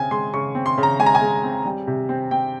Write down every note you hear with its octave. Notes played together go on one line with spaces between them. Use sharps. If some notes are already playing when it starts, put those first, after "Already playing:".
Already playing: C#3 C4 G#5
G#3 C6
C#3 C#6
C4
C6
C#3
A#5
G#3 G#5
A#5
G#5
G#3
C4
G3
C3
C4
C4 G5